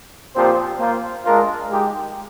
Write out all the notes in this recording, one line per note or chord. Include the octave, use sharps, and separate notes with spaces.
A#2 F3 C4 G4 C5
A#3 F4 C5
G#3 D4 F4 A#4
G#3 D#4 G4